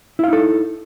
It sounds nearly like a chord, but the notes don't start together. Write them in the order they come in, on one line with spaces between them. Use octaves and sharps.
E4 F5 D#4 A4